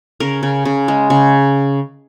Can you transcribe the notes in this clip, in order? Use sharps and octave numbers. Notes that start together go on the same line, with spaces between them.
C#3 A#4
C#3
C#3
G#3
C#3